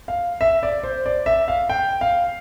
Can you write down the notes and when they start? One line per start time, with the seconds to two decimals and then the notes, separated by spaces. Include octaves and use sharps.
0.08 F5
0.41 E5
0.63 D5
0.83 C5
1.06 D5
1.26 E5
1.48 F5
1.69 G5
2.01 F5